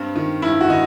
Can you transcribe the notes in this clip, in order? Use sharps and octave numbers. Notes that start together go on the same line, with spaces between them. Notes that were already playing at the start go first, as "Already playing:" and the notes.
Already playing: G2 C4
D#3
G2 E4
F#4
D#3 D#4